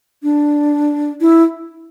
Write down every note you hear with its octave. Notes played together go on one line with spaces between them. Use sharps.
D4
E4